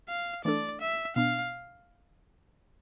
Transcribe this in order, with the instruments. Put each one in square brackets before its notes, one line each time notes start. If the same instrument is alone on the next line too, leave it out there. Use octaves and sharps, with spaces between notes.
[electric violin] F5
[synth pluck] E3 A3 D4 A4 [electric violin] D5
[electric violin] E5
[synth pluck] B2 B3 D4 [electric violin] F5